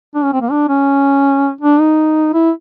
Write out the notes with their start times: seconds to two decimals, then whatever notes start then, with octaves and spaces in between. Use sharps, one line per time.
0.15 D4
0.24 C#4
0.33 C4
0.41 A#3
0.51 D4
0.69 C#4
1.61 D4
1.80 D#4
2.34 E4